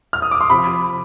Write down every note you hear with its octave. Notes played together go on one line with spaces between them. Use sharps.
F6
D#6
D6
C6
C3 F3 B5